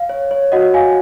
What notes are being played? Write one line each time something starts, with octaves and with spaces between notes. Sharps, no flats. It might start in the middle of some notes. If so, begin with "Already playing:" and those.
Already playing: F5
C#5
C#5
F#4 D#5 F#5
F#4 F5 G#5